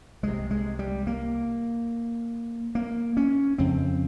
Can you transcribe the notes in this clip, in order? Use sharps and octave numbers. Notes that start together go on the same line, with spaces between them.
C2 C3 G#3
G#3
G3
A#3
A#3
C#4
F2 C#3 C4